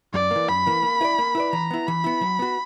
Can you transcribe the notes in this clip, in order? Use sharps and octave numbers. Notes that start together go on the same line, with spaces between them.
F#2 D5
E3 A#3
F#2 B5
E3 A#3
A#3
E4 B4 D5
A#3
E4 B4 D5
E3 A#5
B3 E4
E3 B5
B3 E4
F#3
B3 F#4